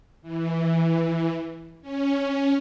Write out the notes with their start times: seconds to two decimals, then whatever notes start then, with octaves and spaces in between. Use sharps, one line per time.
0.22 E3
1.82 C#4